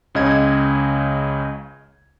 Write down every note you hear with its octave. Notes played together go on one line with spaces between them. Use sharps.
C#2 C#3 D#5 G#6